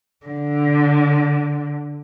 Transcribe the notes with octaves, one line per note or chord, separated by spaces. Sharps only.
D3